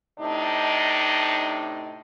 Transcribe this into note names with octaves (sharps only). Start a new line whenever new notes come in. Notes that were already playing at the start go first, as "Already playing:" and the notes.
A2 C3 D4 D#4